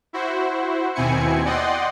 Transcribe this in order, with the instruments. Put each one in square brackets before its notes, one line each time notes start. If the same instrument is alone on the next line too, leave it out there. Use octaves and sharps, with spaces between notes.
[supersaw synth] E4 F#4 C5
D#2 B2 C4 E4 G#5 C#7
D5 D#5 F#5 G5 C6